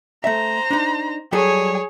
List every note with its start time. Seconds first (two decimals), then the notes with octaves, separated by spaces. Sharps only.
0.24 A3 C5 E5 A#5
0.71 D4 D#4
1.32 F#3 G3 G#4 A4 C#5